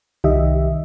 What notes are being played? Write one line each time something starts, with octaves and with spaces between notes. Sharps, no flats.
C2 D#3 G4 D#5 E5